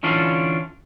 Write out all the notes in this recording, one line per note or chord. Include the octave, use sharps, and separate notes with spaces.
D3 E3 C#4 D4 F4